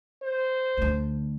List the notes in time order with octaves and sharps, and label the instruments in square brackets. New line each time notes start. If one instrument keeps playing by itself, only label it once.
[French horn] C5
[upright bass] D2 D3